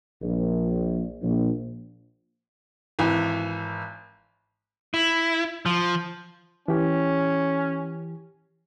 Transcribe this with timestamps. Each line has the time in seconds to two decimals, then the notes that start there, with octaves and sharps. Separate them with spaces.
0.22 A#1
1.22 A#1
2.99 G#1 E3
4.94 E4
5.66 F3
6.68 E3 C#4 G4